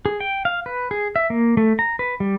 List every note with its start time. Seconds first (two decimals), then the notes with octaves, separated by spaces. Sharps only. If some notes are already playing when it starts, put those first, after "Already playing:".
0.06 G#4
0.20 G5
0.45 F5
0.66 B4
0.91 G#4
1.16 E5
1.30 A#3
1.57 A3
1.79 A#5
1.99 B4
2.20 G3